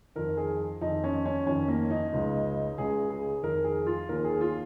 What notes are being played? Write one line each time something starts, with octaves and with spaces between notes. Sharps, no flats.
F2 D#3 A#4
G#4
F2 D#3 D#4
C#4
C#4
F2 D#3 C#4
A#3
D#4
C#2 C#3
C#2 C#3 G#4
G#4
F2 D#3 A#4
G#4
F4
D#2 D#3 A#4
G#4
F4